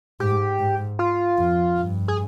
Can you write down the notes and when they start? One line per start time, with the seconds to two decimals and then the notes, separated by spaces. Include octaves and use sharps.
0.20 G#2 G4
0.59 G#2
0.99 F4
1.38 F2
1.78 G2
2.08 G#4